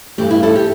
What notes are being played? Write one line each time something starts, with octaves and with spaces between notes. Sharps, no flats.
G2 E3 A3 G4
E4
E4 A4
G4